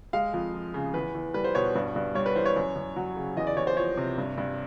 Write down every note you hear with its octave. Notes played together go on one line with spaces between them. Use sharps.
G#3 F5
F2
F3
C#3
E2 B4
E2
G3 B4
C5
B2 C#5
G2
G2
G3 C#5
B4
E3 C5
C#5
F#2
F#2
F#3
C#3
E2 D#5
D5
E2 C#5
C5
F3 C#5
C3
G2
G2